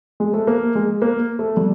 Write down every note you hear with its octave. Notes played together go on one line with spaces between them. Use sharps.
G#3
A3
A#3
G#3
A#3
A3
G3